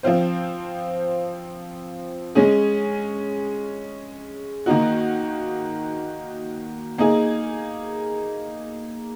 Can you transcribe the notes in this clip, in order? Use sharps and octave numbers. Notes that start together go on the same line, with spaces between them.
F3 C4 F4 C5
G#3 C#4 G#4
D#3 A#3 D#4 F#4
A#3 D#4 G#4